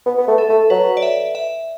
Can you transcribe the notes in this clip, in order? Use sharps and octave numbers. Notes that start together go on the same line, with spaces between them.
B3
B3
A3
A4
A3
F#3 B4
D5
E5
E5